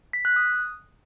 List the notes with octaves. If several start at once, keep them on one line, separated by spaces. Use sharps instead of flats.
B6
F#6
D#6